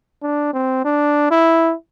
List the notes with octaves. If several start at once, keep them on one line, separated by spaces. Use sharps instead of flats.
D4
C4
D4
E4